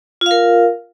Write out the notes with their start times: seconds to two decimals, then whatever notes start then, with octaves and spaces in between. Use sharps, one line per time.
0.21 F4
0.26 F5
0.31 A#4